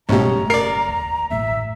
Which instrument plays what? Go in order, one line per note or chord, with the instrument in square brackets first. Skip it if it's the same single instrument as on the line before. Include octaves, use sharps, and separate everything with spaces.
[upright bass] F#1 [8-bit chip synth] G#2 B2 [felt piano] G3 A3 C#4 [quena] A#5
[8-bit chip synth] A#4 D5 [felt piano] C7
[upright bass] D#2
[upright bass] A1 F#2 [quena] E5